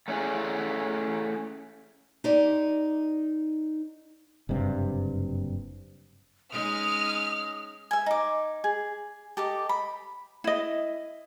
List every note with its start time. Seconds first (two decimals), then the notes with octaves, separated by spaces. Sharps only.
0.08 A3 C#4 E4 G#4
2.24 D#4 G4 C5 D5
4.49 F#1 G2 C3
6.52 G#3 C#4 D#4 D#6 F6
7.91 E5 G#5
8.06 D#4 D6
8.64 G#4
9.37 G4 A4 D#5 D6
9.69 B5
10.44 E4 D#5